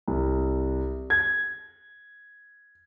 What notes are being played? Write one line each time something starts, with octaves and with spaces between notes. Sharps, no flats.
C2
G#6